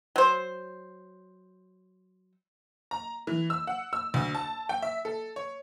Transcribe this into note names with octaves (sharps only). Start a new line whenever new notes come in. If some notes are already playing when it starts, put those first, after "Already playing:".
F#3 C5
A#5
E3
E6
F#5
E6
D2
A5
G5
E5
A4
C#5